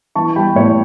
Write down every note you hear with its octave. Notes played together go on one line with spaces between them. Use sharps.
E3 A5 C#6
G3 G5 B5
A2 C#5